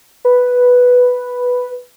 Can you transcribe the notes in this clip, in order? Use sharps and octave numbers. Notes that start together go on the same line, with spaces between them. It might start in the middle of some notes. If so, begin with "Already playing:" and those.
B4